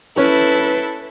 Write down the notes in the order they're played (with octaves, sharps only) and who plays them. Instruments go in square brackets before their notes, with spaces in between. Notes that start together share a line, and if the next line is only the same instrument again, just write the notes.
[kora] C#4 [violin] E4 A4 [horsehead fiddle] B4